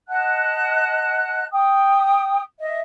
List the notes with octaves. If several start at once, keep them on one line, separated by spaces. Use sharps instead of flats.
D#5 F#5 A5 F#6
G5 D#6
D#5 E5